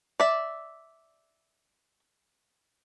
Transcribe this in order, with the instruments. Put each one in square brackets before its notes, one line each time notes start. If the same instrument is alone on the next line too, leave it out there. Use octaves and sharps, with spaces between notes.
[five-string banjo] D5 E5